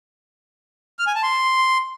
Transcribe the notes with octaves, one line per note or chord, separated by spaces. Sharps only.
F6
G#5
A5
C6